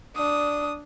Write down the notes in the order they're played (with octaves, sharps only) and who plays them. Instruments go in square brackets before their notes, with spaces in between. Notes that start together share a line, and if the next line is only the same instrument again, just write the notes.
[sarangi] D4 [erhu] D#6